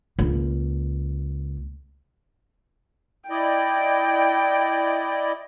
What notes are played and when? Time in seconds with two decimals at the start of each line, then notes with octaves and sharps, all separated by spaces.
0.19 C#2 A#3
3.30 E4 D5 D#5 G5